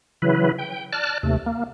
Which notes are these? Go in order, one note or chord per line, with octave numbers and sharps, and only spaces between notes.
C#3 E3 F#3 E4 B4
G5
D5 A5 F6 F#6
D#2 C3 A3
A#3